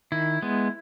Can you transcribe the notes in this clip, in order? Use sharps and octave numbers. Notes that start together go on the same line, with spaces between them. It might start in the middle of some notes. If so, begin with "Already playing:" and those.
D#3 E4
G#3 B3